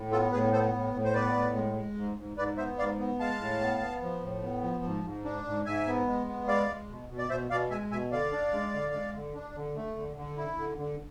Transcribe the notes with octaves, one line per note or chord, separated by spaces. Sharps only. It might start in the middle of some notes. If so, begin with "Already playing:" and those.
Already playing: A2
B3 F4 A4
A2 G#4 B4
B3 A4 C5
A2
A2
C5
B3 B4 D5
A2
G#3
G#3
G#2
G#2
G#2 B4 D5
B3 C5 E5
G#2 D5 F5
B3
G#3 F5 A5
A2
B3
B3
F3
A2
B3
F3
G#2
G#2
D4
G#2
G#2 E5 G#5
B3
G#3
B3
G#3 D5 F5
G#3
B2
B2
D5
B2 C5 E5
B2 D5 F5
G#3 E5 G#5
B2 E5 G#5
D3 D5 F5
D4
G#3
D3
G#3
D3
D4
D3
A3
D3
D3
E4
D3
D3